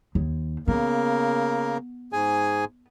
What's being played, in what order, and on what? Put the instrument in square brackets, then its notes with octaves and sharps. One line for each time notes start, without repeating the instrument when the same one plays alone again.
[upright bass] D#2
[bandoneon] C#3 A#3 A#4 [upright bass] B3
[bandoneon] G#2 G#4 G#5